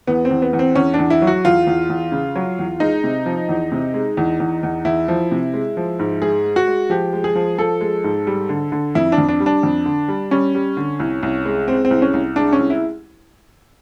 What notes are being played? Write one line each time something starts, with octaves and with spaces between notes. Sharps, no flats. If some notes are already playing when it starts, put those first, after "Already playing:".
E2 B3
C4
E2
B3
E2
C4
E2 C#4
E2 D4
E4
F#3
F#4
E2 F4
E2
E2
C#3
F#3
E2
G#3 D#4
C3
F3
E2
C3
G#3
E2
E2
E2
E2 E4
F3
C3
G#3
F3
G#2
G#3 G#4
G#3
F#4
G#3
F3 G4
G#3
G#4
F3
F3 A4
G#3
G#2
G3
D3
D3
F2 E4
D4
F2
D4
G3
D4
F2
D3
G3
G3 C#4
G3
D3
C2
C2
G#3
G#3 C4
C4
C2
C#4
C2
G#3 D4
C#4
C2
E4